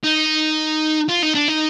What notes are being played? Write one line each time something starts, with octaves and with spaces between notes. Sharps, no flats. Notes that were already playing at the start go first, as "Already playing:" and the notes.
D#4
F4
D#4
D4
D#4